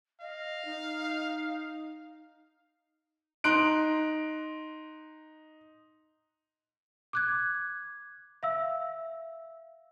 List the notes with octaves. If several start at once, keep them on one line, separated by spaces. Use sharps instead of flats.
D#5 F5
D#4
D#4 C6 F#6 D7
D6 F#6 G#6
E5 F5 E6